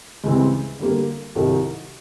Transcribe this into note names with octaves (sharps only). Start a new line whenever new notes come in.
C#2 C#3 E3 G3 C4
D3 G3 A#3
C2 C3 D#3 F#3